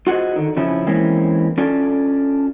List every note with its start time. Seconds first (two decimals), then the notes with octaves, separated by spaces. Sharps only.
0.07 F4 F#4 G#4 C5 D#5
0.36 D3 D#3
0.56 F2 C#3 F3 C#4 E4
0.87 E3 G#3 A#3 C4 C#4
1.58 C#4 D4 F4 A4 D5